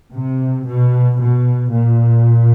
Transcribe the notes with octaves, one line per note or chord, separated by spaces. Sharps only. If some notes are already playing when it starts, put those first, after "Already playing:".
C3
B2
B2
A#2